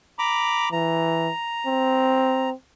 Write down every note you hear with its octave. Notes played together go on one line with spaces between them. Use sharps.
A#5 B5 D6
E3 A#5
C4